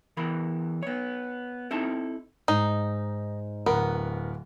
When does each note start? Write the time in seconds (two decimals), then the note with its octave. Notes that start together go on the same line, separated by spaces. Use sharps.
0.17 E2 E3 A#4 B5
0.83 B3 C#5
1.71 C4 D#4 E4 A4 A5 A#5
2.48 G#2 D#4
3.66 D1 B3 A#4 F#5